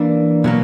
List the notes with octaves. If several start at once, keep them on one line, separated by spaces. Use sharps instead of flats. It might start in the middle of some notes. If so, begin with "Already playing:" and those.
Already playing: E3 A#3 D4
B2 F#3 A#3